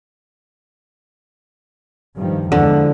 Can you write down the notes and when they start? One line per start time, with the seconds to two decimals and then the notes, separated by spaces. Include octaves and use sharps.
2.16 G2 D#3 F3
2.52 E2 D3 F3 G#3